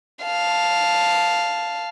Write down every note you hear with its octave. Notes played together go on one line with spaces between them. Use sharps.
F5 A5